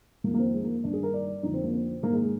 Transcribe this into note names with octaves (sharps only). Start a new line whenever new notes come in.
F2 D#3 A#3
A#3
C4
G#3
A#3
G2 D#3 D4
G#4
A#4
D5
F2 D3 D#4
C4
A#3
C4
G#2 D#3 A#3
G#3
G#3